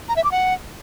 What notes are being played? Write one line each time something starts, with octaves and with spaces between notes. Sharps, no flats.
A#5
E5
D6
F#5